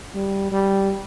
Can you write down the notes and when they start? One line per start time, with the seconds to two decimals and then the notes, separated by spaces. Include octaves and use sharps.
0.15 G3
0.52 G3